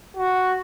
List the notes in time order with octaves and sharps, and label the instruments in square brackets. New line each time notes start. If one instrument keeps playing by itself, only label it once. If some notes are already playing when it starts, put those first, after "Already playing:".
[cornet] F#4